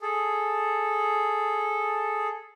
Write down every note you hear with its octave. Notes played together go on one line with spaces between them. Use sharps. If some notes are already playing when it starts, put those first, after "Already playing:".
G#4 A4